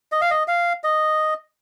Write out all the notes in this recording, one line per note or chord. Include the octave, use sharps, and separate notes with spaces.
D#5
F5
D#5
F5
D#5